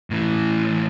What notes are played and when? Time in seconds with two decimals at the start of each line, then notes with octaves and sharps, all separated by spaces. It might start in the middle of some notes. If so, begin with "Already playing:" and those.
0.10 A2 E3